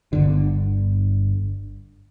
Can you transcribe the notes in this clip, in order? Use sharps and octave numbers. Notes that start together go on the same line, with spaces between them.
G1 D3